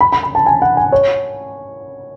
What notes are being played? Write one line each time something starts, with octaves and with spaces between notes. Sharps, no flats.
B5
B5
B5
A5
G#5
F#5
G#5
C#5